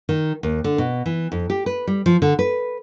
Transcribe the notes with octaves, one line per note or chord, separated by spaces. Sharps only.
D#3
D#2
D3
B2
E3
F2
G4
B4
G3
F3
D3
B4